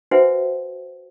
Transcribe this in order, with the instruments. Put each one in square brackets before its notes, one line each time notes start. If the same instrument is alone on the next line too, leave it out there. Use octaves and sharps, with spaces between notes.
[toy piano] F#4 B4 C5 E5 F#5 G#5